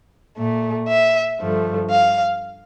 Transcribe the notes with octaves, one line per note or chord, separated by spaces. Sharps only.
A#2 A3
E5
G2 D3 F3 A3
F5